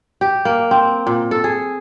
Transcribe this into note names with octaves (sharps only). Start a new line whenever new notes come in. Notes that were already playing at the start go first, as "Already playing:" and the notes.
G4
A#3
C4
A#2
A4
G#4